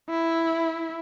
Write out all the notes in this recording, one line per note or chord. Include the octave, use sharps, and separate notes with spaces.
E4